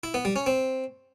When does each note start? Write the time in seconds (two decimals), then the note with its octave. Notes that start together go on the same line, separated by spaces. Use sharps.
0.04 E4
0.14 B3
0.25 G3
0.36 C#4
0.46 C4